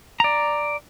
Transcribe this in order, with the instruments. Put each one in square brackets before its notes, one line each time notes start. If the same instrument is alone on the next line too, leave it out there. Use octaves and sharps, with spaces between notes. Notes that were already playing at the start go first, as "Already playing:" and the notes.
[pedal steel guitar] D5 A#5